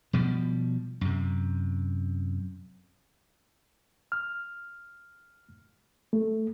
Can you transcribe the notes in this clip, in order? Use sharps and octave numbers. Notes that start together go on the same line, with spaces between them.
B2 F3 G3
F#2 C3
F6
A3